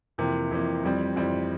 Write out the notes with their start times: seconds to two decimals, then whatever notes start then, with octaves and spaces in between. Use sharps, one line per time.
0.18 F2 C3 E3 A#3
0.51 F2 C3 E3 A#3
0.83 F2 E3 G3 C4
1.16 F2 E3 G3 C4